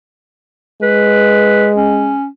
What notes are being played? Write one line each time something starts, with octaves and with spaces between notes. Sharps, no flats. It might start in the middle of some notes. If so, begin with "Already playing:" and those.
G#3 B4
C#4